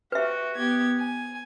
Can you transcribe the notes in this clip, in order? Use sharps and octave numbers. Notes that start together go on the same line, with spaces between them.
F#4 G4 B4 E5
B3 G4 G#6
G#5